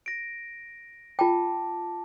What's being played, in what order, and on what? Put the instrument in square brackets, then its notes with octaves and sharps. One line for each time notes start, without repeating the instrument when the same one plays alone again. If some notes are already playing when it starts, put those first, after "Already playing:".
[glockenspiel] A#6 D7
[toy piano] F4 G5 [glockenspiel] A5 D6